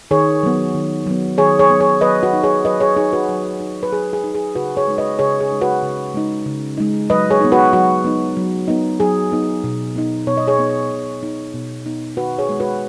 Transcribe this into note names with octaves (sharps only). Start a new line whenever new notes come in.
D#3 G#4 C#5
F#3 B3
D#3
F#3 B3
D#3 G#4 C#5
G#4 C#5
F#3 B3
G#4 C#5
F#3 B4 D#5
F#4 B4
D#4
G#4 C#5
F#3 B4 D#5
G#4 C#5
D#4 G#4
F#4 B4
F#3
D#4
B4
F#3 G#4
G#4
D#4
G#4
C#3 F#4 B4
G#4 C#5
G#3 D#4
B4 D#5
C#3 G#4 C#5
G#4
G#3 D#4
F#4 B4
C#3
G#3 D#4
C#3
G#3 D#4
F#3 B4 D#5
G#4 C#5
B3 D#4
F#4 B4
F#3 F#4
B3 D#4
F#3
B3 D#4
F#3 G#4
B3 D#4
B2
B3 D#4
B2 C#5
D#5
G#4 C#5
B3 D#4
B2
B3 D#4
B2
B3 D#4
D#3 F#4 B4
G#4 C#5
G#3 B3
F#4 B4